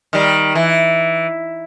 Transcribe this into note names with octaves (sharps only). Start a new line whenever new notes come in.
D#3 G3
E3